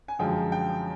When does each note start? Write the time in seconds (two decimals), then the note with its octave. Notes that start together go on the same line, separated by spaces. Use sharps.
0.08 G#5
0.19 F#2 D3 F3 G#3 G5
0.52 G5